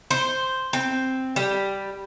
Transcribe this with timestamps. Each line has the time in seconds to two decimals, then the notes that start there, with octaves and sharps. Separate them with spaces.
0.11 C5
0.73 C4
1.36 G3